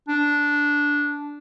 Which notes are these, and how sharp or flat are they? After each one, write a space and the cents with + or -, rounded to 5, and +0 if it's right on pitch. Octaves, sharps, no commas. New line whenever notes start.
D4 -10